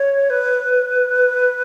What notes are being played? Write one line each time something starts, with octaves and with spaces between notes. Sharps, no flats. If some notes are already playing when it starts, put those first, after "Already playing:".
Already playing: C#5
B4